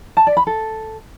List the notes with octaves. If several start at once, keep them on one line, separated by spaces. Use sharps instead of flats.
A5
D5
B5
A4